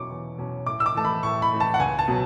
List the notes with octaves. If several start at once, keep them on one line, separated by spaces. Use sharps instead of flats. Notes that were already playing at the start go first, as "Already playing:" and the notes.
Already playing: E2 B2 F#3 C#4 C#6 D6
E2
B2 F#3 C#4
A2 D6
E6
D6
E3 A3 A5
B5
A2 C#6
B5
E3 A3
A5
F#5
C#2 G#5
A5
B2 F#3 B3